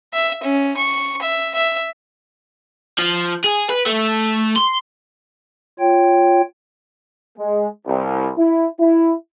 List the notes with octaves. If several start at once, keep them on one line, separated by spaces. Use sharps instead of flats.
E5
C#4
C#6
E5
E5
F3
G#4
B4
A3
C6
F4 C#5 G5
G#3
C2
E4
E4